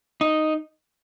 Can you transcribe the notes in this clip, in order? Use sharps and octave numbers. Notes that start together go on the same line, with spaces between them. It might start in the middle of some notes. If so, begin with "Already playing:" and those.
D#4